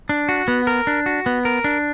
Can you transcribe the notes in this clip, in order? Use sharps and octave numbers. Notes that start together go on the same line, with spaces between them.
D4
F#4
B3
A#4
D4
F#4
B3
A#4
D4